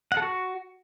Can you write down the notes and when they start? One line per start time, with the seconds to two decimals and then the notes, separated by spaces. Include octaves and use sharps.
0.12 F#5
0.17 A4
0.22 F#4